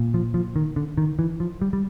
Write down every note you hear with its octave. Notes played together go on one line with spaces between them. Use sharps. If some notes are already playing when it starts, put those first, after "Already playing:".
Already playing: A#2
F3
F3
D#3
D3
D#3
E3
F3
G3
G3